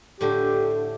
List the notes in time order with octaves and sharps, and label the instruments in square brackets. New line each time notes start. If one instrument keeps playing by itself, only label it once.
[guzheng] A2 D3 [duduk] G4